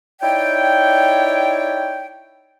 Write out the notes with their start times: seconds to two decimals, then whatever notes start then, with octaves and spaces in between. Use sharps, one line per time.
0.22 D#4 E4 C#5 D5 G5